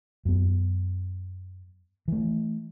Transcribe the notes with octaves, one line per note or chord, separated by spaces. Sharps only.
F#2 B3
E3 A3